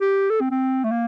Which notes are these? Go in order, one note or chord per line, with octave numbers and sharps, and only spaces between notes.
G4
A4
C4
C4
A3
A#3